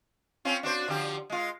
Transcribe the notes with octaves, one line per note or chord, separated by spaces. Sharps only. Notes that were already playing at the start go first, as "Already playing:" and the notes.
C4 C#4 F4
D4 F#4 C5
D3 F3 G4
G#3 F4